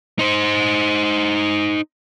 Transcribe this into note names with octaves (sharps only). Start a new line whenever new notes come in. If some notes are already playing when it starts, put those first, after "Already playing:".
D#4 C5